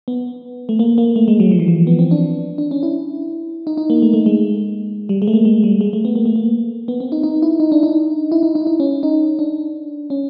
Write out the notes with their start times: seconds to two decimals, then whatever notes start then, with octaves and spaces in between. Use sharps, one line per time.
0.08 B3
0.69 A3
0.79 A#3
0.98 A#3
1.16 A3
1.28 G#3
1.40 F#3
1.51 F3
1.59 E3
1.68 F3
1.87 B3
1.99 C4
2.11 D4
2.58 D4
2.71 C#4
2.83 E4
3.67 D#4
3.77 D#4
3.90 A#3
4.02 A3
4.13 A3
4.26 G#3
5.09 G3
5.22 G#3
5.27 A3
5.33 A#3
5.45 G#3
5.64 G3
5.81 G#3
5.93 A3
6.05 B3
6.15 A#3
6.26 A3
6.36 A#3
6.88 B3
7.00 C4
7.12 D#4
7.23 D#4
7.42 E4
7.60 D#4
7.72 D4
7.83 D#4
8.32 E4
8.43 D#4
8.55 D#4
8.67 D#4
8.80 C#4
9.03 D#4
9.39 D4
10.10 C#4